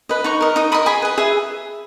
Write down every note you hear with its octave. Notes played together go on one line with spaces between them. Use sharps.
B4 D#5
D#4 A#5 C#6
A#4 D#5
D#4 D#6
A#4 D#5 B5 D#6
G#4 G#5 B5
B4 D#5
G#4 E5